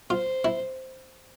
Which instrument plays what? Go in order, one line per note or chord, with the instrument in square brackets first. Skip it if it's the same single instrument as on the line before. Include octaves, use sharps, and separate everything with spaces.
[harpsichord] F4 [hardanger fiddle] C5
[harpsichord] E4